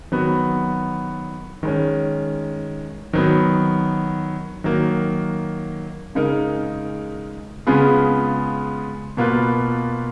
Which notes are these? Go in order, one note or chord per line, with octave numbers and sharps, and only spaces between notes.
D#3 F#3 B3 F#4
D#3 G#3 C#4
D#3 F#3 B3
D#3 F#3 A#3
C#3 G#3 D#4 A#4
C#3 G#3 B3 F4 G#4
B2 A#3 F4 B4